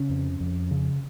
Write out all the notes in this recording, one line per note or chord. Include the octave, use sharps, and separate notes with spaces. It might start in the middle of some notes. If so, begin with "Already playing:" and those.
Already playing: C#3 C#4
F2
F2
C#3